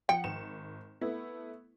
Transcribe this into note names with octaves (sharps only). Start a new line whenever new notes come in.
F3 F#5 G5 C#7
G#1 E7
A3 B3 E4